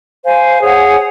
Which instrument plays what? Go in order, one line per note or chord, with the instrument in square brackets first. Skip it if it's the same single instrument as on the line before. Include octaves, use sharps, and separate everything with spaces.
[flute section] C5 F5 G#5
G#4 C#5 F#5